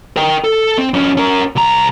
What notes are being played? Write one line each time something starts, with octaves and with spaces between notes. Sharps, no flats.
A#4 G5
A4
C4
F2 C#4
C#4 A#4
C2 A#5